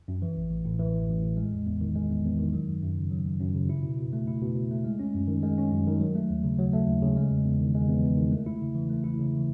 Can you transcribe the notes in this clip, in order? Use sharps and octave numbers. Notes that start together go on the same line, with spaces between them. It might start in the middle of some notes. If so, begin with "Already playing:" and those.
F#2
E3
A1
A1
A2
E3
A1
A1
A2
G#3
E2
E2
D#3
G#3
E2
E2
D#3
F#3
F#2
F#2
C#3
F#3
F#2
F#2
C#3
E4
B2
B2
A3
E4
B2
B2
A3
G#3
C#4
F#2
D#3
G#3
C#4
F#2
D#3
F#3
A3
D#2
C#3
F#3
A3
D#2
C#3
G#3
E2
E2
D#3
G#3
E2
E2
D#3
A3
E4
C#3
E3
A3
E4
C#3
E3